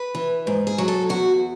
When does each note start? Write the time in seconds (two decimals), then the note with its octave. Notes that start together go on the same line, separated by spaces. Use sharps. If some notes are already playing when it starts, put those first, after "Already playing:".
Already playing: B4
0.15 E3
0.47 G#2
0.67 G#4
0.78 F#3
0.88 A4
1.09 E2 F#4